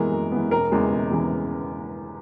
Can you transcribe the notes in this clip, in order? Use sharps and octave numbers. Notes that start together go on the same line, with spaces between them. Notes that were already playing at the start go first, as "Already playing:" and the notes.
Already playing: F#2 E3 G#3 B3 A#4
F#2
E3 G#3 B3
E1 A#4
E2 C#3 E3 G#3
E1
E2 C#3 E3 G#3